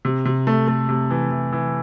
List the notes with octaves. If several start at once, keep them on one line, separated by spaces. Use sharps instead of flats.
C3
C3
A3
A3
C3
E3
E3
E3